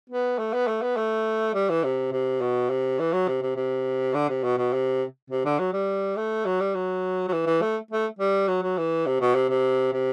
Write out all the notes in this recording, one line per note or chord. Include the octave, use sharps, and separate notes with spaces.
B3
A3
B3
A3
B3
A3
G3
E3
C3
C3
B2
C3
E3
F#3
C3
C3
C3
D3
C3
B2
B2
C3
C3
D3
F#3
G3
A3
F#3
G3
F#3
F#3
E3
E3
A3
A3
G3
F#3
F#3
E3
C3
B2
C3
C3
C3